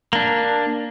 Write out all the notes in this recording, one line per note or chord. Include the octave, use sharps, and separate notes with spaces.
A#3 D4